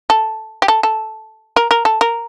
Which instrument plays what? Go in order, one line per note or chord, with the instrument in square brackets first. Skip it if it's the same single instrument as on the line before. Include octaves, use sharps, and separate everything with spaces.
[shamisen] A4
G4
A4
A4
A#4
A#4
A4
A#4